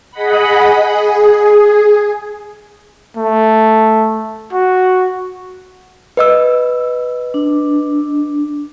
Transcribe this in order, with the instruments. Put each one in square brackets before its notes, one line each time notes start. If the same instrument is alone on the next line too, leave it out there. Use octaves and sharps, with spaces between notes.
[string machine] G#4 D#5 F#5 B5
G#4
[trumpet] A3
F#4
[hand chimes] B4 D#5 E6
[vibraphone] D4